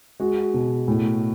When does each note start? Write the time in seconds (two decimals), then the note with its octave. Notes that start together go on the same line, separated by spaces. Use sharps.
0.20 G#3 F#4
0.54 B2
0.88 A2